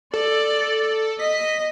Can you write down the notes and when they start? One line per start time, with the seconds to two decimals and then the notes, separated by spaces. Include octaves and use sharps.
0.14 A4 D5
1.19 D#5 B6